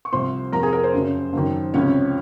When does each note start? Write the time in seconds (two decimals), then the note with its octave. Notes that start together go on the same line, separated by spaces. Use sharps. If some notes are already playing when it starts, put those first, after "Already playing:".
0.05 C#6
0.12 C2 C3 F3 C5 C6
0.52 F2 C3 F3 A#4 A#5
0.63 G#4 G#5
0.73 A#4
0.83 C5
0.93 F#1 F#2 C#3 F#3
1.33 F#1 F#2 D#3
1.74 C#2 C3 F3 C#4 C#5